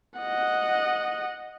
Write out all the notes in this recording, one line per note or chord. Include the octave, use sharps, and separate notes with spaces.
D#5 F#5